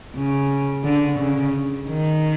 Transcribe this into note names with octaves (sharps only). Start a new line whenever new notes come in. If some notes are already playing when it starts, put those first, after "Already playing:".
C#3
D3
C#3
D#3